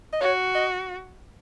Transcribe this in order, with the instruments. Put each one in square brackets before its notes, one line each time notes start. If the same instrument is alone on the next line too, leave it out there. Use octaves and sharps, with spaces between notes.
[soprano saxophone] D#5
[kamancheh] F#4 [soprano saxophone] C#5
[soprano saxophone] D#5